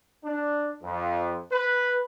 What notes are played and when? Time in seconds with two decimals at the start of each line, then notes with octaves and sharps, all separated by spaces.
0.23 D4
0.83 F2
1.51 B4